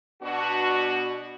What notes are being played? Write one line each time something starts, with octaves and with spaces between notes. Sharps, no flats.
B2 D4 F#4